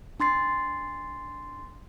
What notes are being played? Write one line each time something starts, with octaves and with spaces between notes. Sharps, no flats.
D4 C6 A6 C7